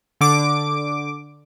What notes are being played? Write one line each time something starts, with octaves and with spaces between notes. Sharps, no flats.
D3 D6